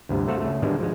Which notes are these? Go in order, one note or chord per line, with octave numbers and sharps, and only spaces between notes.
D2 G2 C3
A3 F#4 A4 C5 F5 F#5
C#3 A3
B2 D3 D#3 G3 G#3
F3 G#3